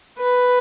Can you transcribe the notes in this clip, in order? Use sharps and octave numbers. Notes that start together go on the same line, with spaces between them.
B4